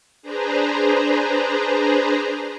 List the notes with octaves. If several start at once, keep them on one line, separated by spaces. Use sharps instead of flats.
D4 G#4 B4 C5 A#5